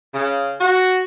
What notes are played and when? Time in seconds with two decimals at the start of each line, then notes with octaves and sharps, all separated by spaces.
0.14 C#3
0.61 F#4